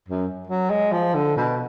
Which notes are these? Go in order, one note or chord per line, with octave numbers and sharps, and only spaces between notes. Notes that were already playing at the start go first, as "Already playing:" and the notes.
F#2
F#3
G#3
F3
D3
B2